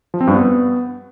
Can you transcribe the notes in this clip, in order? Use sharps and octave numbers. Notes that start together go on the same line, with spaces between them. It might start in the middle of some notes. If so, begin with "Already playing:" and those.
F3
C4
G2
B3